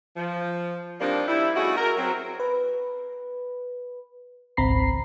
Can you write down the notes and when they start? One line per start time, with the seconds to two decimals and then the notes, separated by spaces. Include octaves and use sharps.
0.16 F3
1.01 D#3 F3 G3 A#3 C4 D4
1.28 G3 E4
1.56 A3 C#4 D#4 E4 F#4 G#4
1.77 A#4
1.97 F#3 C4
2.40 B4
4.57 G#1 C#2 C4 A#5 B5 C7